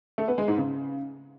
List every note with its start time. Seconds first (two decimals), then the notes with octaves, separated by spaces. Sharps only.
0.18 A3
0.28 B3
0.38 G#3
0.48 G#2
0.58 C#3